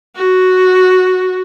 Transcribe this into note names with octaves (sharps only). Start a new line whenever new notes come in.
F#4